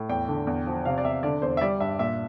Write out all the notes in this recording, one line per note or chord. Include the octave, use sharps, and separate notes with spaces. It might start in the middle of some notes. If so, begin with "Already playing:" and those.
Already playing: A2
E2 G5
D3
E2
F3
C3 F5
D5
E2 E5
D3 D5
E2 C5
E5
G3 D5
G2 E5
A#2 E5